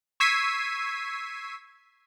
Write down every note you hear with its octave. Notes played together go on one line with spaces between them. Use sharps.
C#6 E6 G#6 B6 C7 D#7